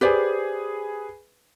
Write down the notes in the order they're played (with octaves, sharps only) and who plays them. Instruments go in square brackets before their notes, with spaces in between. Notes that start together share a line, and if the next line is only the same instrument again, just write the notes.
[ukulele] G4 C5 D5 [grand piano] G#4 B4